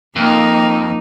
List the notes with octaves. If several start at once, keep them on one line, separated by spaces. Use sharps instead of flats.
F2 A#3 D#4